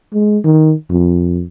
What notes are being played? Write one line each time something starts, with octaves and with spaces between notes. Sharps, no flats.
G#3
D#3
F2